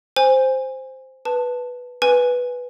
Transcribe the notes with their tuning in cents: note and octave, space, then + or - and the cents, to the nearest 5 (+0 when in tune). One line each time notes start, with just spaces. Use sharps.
C5 +0 G#5 -20
B4 +0 A5 +0
B4 +0 G#5 +0